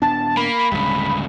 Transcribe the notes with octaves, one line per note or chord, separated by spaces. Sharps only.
D#1 B3 D4 A5
A#3 B5
D1 D2 G2 C#3 G#3